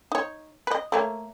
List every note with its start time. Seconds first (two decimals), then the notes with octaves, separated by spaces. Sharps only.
0.12 D#4 C#5
0.67 B4 D#5
0.92 A3 A#3 C#5